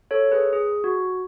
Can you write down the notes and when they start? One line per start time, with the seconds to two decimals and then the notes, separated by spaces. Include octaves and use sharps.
0.11 A4 C#5
0.32 G#4 B4
0.53 G#4
0.84 F#4